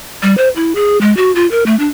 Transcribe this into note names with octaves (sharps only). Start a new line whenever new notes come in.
G3
C5
E4
G#4
G#3
F#4
F4
A#4
A3
D4